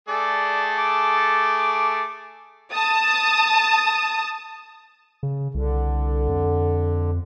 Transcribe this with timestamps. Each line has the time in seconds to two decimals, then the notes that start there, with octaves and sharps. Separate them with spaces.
0.09 A3 G#4 A4 D5
0.78 D6
2.73 A5 D#6
5.23 C#3
5.55 C2 D3
6.29 F2